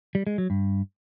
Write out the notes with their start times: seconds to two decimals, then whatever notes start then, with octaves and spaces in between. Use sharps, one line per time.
0.15 G3
0.27 G#3
0.38 F#3
0.50 G2